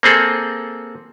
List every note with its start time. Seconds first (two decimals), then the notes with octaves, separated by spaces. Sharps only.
0.03 A#3 C4 G#4 A4